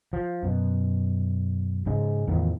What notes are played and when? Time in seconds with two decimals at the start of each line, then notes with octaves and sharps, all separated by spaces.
0.13 F3
0.43 F#2 B2
1.86 G#2 C#3 G#3
2.27 E2 A2 D#3 F3